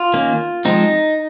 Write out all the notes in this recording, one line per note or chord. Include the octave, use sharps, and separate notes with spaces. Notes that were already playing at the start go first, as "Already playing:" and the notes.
Already playing: F4
D#3 A#3 C#4
F3 G#3 C4 D#4